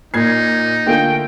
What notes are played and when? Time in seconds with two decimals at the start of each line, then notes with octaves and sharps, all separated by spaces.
0.14 A#2 A#3 D#4 G#6 C7
0.87 D3 A3 F4 A#4 F5 G5 G#5